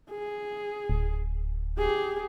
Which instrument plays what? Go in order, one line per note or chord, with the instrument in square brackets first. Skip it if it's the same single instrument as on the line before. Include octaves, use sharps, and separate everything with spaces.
[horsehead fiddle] G#4
[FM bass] D1
[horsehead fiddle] G4 G#4